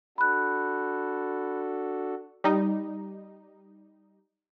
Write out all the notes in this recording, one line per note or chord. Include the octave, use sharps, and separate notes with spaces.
D4 F#4 A4 B5 F#6
G3 D#4